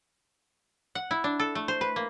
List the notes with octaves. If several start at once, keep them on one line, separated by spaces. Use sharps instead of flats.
F#5
E4
D4
A4
A3
C5
B4
A#3